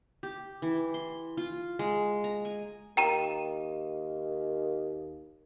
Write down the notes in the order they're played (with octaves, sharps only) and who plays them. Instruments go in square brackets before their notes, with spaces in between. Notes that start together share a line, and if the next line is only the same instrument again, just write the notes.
[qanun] G4
E3
C6
F4
G#3
A#5
G#5
[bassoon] D#2 [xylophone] G5 A#5 D#7